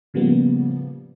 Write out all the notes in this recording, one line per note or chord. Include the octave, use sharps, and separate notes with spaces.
A2 C#3 F3 G3 A#3 B3